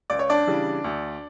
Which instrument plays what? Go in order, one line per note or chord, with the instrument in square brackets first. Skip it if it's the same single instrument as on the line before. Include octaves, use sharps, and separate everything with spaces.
[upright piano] C#2 D5
C#5
D4 D5
C#3 E3 G3
D2